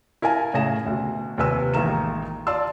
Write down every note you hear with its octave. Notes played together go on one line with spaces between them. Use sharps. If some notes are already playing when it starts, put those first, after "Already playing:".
E4 A#4 F5 G#5 A5
A2 C#3 G#4 G#5 A#6 E7
D2 B2
D#2 C3 F3 B4 G#5 E6
A1 D#3 G#3 A#3 A#5 E7
F4 D5 A5 C6 E6